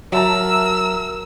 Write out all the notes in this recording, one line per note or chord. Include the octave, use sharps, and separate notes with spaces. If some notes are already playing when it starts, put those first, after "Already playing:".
F#3 A#4 E5 A5 A#5 E6